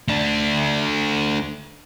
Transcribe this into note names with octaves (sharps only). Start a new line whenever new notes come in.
A3 D4